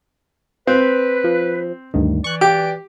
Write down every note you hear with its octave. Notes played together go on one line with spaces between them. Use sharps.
C4 B4
F3
D2 G2 D#3
E3 D5 C#6 F#6
G4 D7